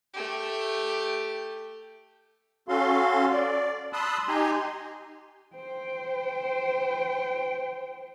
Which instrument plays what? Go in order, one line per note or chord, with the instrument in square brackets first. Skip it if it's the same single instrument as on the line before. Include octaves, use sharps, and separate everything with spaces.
[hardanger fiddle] A3 G4
[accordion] C#4 F#4 A4 F5 C6
D5
A5 B5 C6 D#6 E6 F#6
D#4 G4 G#5 A#5 C6
[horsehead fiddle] C5 G5